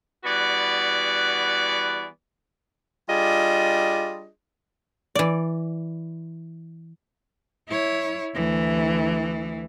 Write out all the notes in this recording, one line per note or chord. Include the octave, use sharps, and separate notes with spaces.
E3 G3 B3 F#4 D5
G3 D4 F4 G#4 D#5
E3 D5
E4 C#5
D2 E3